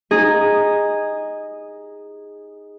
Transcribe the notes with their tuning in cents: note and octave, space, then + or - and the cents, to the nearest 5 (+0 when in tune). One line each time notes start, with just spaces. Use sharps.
D#4 +0 G#4 -15